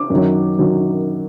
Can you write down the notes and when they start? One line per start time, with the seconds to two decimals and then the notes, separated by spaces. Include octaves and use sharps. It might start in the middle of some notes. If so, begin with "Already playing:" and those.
Already playing: D6
0.10 F#2 D#3 F#3
0.59 D#3 F#3